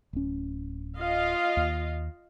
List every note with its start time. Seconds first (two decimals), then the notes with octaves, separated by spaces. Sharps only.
0.13 D1 C#4
0.99 F4 D#5 F5
1.57 D#2